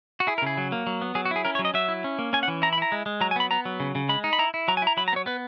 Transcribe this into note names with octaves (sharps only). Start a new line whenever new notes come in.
F#4
E4 G#4
A#4
C#3 G#4
F#3
A#3
F#3
B3
F#3 G#4
F#4
E4 G#4
C#4 A#4
C#5
F#3
D#5
F#3 E5
E4
C#4
A#3
C#4 G#5
F#5
E3
E4 A#5
B5
E4 A#5
G#3
G#3
F#3 A#5
G#5
B3 B5
B3 A#5
F#3
C#3
C#3
G#3 B5
D#4
B5
E4 A#5
E4
F#3 A#5
G#5
E4 A#5
F#3 B5
A#5
B3
C#5
B3 B4